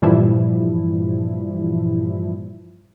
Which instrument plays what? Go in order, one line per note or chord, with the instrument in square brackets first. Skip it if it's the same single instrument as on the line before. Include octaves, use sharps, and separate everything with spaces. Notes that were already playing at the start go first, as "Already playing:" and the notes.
[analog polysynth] G2 A#2 E3 F3 G3 E4